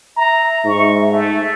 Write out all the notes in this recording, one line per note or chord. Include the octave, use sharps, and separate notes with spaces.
E5 A#5
G#2 C#6
A3